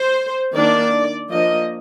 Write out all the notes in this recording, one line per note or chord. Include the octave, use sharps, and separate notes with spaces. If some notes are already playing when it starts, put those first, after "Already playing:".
Already playing: C5
D#3 A#3 D4 D5
F3 A#3 D4 D#5